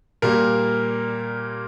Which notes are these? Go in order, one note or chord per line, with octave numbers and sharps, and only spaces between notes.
A#2 G3 A#3 A#4